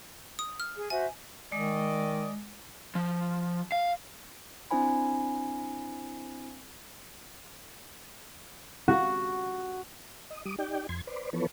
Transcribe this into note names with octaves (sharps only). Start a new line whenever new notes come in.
D#6
F6
G#4
F#4 C5 E5 G#5
D#3 G#3 D5 D#5
F3
F5
C4 D4 E4 C5 G#5 B5
F#4
D#5
G3 D6 D#6
D#4 G4 D5 G5
F2 C6 G#6
B4 C5 D5
E3 F3 B3 A4 B4 C#5